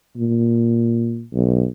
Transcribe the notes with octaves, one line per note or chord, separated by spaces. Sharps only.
A#2
B1